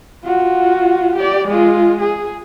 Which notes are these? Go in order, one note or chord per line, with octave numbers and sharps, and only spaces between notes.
F4 F#4
G4 D5
G#3 F4
G#4